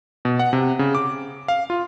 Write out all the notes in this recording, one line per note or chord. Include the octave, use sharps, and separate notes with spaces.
B2
F#5
C3
C#3
D6
F5
F4